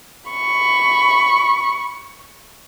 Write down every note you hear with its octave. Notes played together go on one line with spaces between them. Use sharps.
B5 C#6